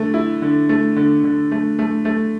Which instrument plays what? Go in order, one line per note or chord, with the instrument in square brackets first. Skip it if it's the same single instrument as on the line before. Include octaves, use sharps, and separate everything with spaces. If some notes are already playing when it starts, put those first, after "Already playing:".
Already playing: [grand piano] D3 A3
E4
D3
A3
D3
D3
A3
A3
A3